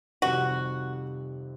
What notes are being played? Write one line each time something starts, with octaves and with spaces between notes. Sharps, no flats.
F2 C3 D#3 G3 C4 F#4